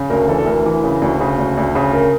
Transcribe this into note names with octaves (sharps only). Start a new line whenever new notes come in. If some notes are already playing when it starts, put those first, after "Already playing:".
Already playing: C#3
D2 A#4
E3 A4
A4
D2 A#4
E3
C#3
D2
C#3
D2
D2
C#3
A#4